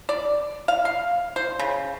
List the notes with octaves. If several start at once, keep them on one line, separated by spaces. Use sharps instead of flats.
D5
F5
F5
C5
C#3